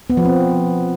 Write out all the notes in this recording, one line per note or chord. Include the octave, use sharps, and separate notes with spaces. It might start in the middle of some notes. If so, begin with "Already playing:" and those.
B3
F3
C4